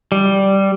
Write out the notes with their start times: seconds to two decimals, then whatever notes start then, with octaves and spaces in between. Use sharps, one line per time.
0.12 G3